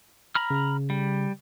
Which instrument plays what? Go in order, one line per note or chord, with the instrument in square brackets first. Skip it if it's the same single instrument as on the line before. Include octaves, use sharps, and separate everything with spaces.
[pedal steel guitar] A#5 B5 F6
[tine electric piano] C#3
[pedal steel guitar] G3